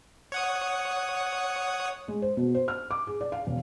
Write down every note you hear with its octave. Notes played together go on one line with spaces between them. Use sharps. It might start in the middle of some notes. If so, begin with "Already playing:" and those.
C#5 F#5 D#6
G#3
C5
B2
C5
F6
D6
G#4
D5
F5
E1